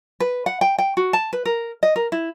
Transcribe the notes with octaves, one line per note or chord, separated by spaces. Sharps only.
B4
F#5
G5
G5
F#4
A5
B4
A#4
D#5
A#4
E4